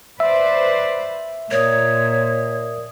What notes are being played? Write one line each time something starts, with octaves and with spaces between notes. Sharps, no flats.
B4 C5 D5 E5
A#2 A#4 C#5 D5 D#6